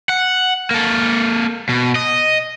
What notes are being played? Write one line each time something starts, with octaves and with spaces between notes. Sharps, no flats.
F#5
A#3 A4
B2
D#5